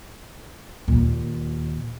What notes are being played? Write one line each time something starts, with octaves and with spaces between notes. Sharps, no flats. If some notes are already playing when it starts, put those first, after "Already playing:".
D#2 A#2